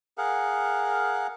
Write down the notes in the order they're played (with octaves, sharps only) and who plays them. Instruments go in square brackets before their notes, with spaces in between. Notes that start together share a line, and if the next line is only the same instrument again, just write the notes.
[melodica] G#4 A#4 F5 F#5